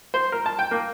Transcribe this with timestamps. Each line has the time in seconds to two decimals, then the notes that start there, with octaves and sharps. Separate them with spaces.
0.14 C5
0.32 A#4
0.46 A5
0.59 G5
0.71 A#3